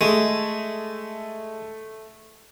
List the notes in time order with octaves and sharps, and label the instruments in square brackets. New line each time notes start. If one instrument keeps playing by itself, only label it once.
[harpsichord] G#3 [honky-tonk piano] A3